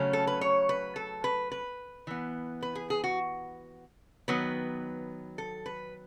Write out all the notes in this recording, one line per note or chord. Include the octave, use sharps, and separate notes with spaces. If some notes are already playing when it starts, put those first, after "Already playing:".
Already playing: C#3 F#3 A3 C#4
A4
B4
C#5
B4
A4
B4
B4
E3 B3
B4
G#4
G#4
F#4
D#3 F#3 B3 B4
A4
B4